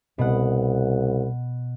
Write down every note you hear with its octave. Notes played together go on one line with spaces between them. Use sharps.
C2 B2 F#5